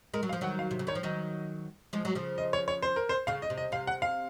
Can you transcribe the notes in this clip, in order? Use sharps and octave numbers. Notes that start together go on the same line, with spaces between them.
G#3 A#4
F#3
F5
F3
D#3 F#3 F#5
F5
C3
C#3
D#3 C#5
F3
D#3 F#3 D#5
F3 G#3
F#3
C#3 F3
D#5
C#5
C#5
C5
A#4
C5
C#3 F5
D#5
C3
D#5
C3 F5
F#5
F5